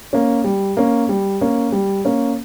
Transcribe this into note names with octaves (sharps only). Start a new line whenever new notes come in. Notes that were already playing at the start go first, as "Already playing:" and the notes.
A#3 C#4
G3
A#3 C#4
G3
A#3 C#4
G3
A#3 C#4